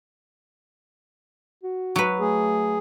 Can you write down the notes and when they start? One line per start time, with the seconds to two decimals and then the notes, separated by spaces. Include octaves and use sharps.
1.63 F#4
1.96 F#3 B4
2.19 A3 G#4